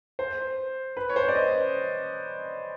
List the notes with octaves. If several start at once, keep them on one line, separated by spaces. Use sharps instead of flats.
C5
B4
C#5
C5
D5
D#5